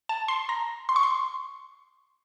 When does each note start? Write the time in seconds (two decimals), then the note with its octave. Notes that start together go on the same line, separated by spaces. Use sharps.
0.09 A5
0.28 C6
0.49 A#5
0.89 C6
0.96 C#6
1.03 C6